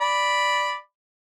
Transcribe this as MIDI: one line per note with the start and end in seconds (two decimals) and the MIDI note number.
0.01 0.78 74
0.01 0.78 83